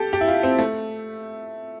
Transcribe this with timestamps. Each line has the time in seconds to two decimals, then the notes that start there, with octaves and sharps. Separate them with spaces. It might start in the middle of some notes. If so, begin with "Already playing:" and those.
Already playing: G4 A4
0.13 G4
0.21 E4
0.28 F4
0.43 C4
0.59 A3